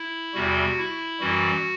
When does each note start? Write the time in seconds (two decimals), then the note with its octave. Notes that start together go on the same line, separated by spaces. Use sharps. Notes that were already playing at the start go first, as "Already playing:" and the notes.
Already playing: E4
0.34 E2 C3 G3 F#4
0.78 E4
1.20 F#2 E3 G3 F#4